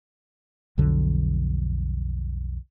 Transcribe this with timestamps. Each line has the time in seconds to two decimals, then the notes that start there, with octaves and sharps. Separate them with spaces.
0.78 B1 F2 D3 F#3